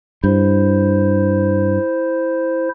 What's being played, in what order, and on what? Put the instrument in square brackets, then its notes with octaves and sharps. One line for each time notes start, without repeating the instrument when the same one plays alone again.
[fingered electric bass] G2 [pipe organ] E4 C5